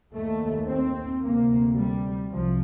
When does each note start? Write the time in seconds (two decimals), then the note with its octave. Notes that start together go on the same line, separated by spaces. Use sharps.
0.12 D#2 A3
0.67 C4
1.21 D2 C3 A#3
1.76 G3
2.30 C2 C3 F3